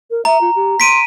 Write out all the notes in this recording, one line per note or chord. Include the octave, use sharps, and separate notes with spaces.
A#4
E5 A#5
F4
G4
C6 B6 D7 D#7